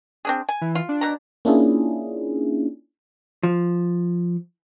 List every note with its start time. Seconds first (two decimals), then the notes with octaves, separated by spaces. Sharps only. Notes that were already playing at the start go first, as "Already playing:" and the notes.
0.25 C4 D4 G#4
0.49 G#5
0.61 E3
0.75 F4
0.89 D4
1.01 B2 A#5
1.45 A#3 C#4 D4 E4 F4 G#4
3.43 F3